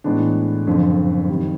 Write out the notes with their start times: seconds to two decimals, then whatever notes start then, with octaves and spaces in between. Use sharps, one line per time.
0.04 A2 E3 G#3 B3 D4
0.67 F#1 F2 D3
1.29 F#1 F2 C3 D#3 G3